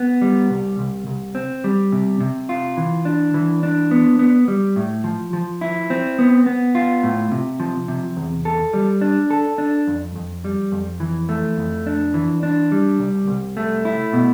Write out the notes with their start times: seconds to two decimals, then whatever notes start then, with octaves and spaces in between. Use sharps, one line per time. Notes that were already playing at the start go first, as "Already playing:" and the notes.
Already playing: B3
0.22 G3
0.50 C2
0.79 C2
1.07 C2
1.35 C4
1.64 G3
1.92 C3
2.20 C3
2.49 F4
2.77 E3
3.05 D4
3.34 E3
3.63 D4
3.91 B3
4.19 B3
4.48 G3
4.76 A2
5.04 F3
5.33 F3
5.61 E4
5.90 C4
6.19 B3
6.46 B3
6.75 F4
7.03 A2
7.32 C3
7.60 F3
7.88 C3
8.17 E2
8.45 A4
8.73 G3
9.01 D4
9.30 A4
9.58 D4
9.87 F2
10.15 F2
10.45 G3
10.72 F2
11.00 E3
11.29 A3
11.57 F2
11.86 D4
12.14 E3
12.43 D4
12.72 G3
12.99 C2
13.27 C2
13.57 A3
13.85 E4
14.13 B2